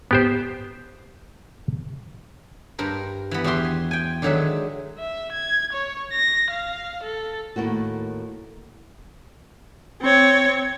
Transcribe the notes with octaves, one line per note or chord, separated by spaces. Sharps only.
B3 G4 C5
G2 A#4 C5
E3 B3
E2 F#4 G4 E5 C6
G#5
G5 G#5
D3 D#3 F#3 G#3 E5
E5
G#6
C#5
A#6
F5
A4
D#2 A2 A#3 F#4
C4 C#5